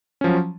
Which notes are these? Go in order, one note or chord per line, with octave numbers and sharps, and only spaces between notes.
F3 F#3 C#4